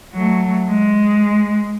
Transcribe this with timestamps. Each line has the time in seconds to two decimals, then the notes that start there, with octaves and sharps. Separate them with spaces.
0.13 F#3 A3
0.70 G#3